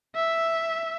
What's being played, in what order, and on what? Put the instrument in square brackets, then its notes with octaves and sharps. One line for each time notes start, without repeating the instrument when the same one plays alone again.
[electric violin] E5